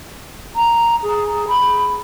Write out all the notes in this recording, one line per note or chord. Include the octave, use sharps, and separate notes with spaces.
A#5
G#4
B5